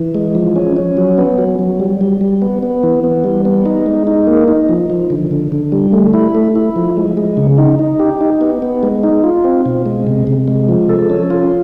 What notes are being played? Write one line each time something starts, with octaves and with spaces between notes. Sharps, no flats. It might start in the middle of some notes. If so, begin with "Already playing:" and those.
Already playing: E3
G#3
F3
C#4
C#4
F#3
B3
F#3
F#3
G3
G3
G3
B3
B3
E3
B3
G3
B3
D#4
G#3
D#4
A#3
D#4
F3
F3
D3
D3
D3
G3
A3
E4
A3
E4
F3
G#3
G#3
C#3
D#4
D#4
G4
D#4
B3
B3
G#3
D#4
F4
C4
B2
G#3
C3
C3
G#3
F3
A4
C#4
F4